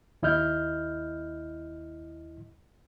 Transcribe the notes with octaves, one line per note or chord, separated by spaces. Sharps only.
D#2 E4 D#5 F6 G6